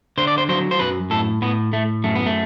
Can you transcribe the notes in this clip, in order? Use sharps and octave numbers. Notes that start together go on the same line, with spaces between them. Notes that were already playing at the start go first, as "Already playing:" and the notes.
D3 C5
D5
C5
F#3 C5
C5
F#2 B4
A2 A4
A2 B3
A2 A3
F#2 A3
B3
A3